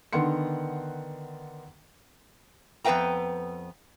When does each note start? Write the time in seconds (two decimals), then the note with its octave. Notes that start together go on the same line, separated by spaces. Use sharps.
0.13 D3 D#3 B3 F#5 C6 C#7
2.84 F2 B3 B4 F5 G5 A#5